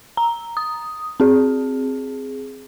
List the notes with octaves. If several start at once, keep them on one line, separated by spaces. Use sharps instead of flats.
A#5
D#6
C4 G#4